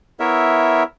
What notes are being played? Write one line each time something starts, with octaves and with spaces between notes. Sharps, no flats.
B3 E4 A#4 C#5 E5